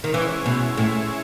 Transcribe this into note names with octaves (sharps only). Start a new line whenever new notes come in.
D#3
E3 G#3 C#4 E4
B2
A2